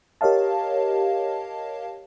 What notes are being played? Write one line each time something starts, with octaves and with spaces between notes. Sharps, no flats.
G4 A#4 C#5 D#5 F5 A5